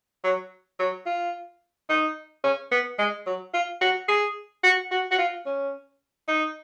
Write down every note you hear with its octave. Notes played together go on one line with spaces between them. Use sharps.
F#3
F#3
F4
D#4
C#4
B3
G#3
F#3
F4
F#4
G#4
F#4
F#4
F#4
F4
C#4
D#4